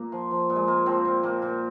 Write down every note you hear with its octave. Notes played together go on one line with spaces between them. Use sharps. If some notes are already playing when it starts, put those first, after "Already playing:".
Already playing: A#2 A#3
F3
F3
A#2
G#3
A#2 A#3
F3 C4
A#2
A#2 A#3
A#2